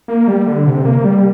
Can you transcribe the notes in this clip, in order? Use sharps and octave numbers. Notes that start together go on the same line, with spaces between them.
A#3
G3
D3
C3
A#3
G3